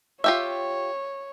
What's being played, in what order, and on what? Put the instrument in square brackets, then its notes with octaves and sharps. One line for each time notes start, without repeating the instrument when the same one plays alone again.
[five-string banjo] F4 G4 E5 [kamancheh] C#5